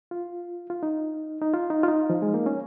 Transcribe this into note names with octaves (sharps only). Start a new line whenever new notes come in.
F4
F4
D#4
D#4
F4
D#4
F4
D#4
F3
G#3
A#3
C#4